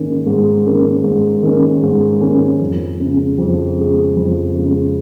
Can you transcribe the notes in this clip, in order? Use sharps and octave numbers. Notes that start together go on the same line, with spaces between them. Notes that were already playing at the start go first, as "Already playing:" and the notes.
Already playing: G#2 D#3 A#3 C#4
G#2
D#3 A#3 C#4
G#2
D#3 A#3 C#4
G#2
D#3 A#3 C#4
F2
C#3 G#3
F2
C#3 G#3
F2
C#3 G#3